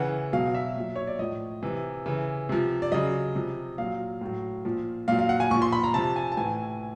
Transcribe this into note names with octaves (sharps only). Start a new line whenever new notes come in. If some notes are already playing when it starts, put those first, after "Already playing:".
Already playing: C#3 E3 F#5
B2 F#3 F5
E5
A#2 F#3
C#5
D5
A2 F3 D#5
C3 E3
C#3 E3
C3 F3
D5
C#3 F#3 D#5
C3 F3
A#2 F#3 F5
A2 F#3
A#2 F3
A#2 F#3 F5
F5
F#5
G#5
A#2 F3 C#6
C6
B5
A#5
C3 F3 A5
G#5
A5
A2 E3 G#5